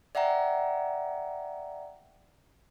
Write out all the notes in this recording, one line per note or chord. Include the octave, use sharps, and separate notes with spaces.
D5 E5 F#5 G5 A#5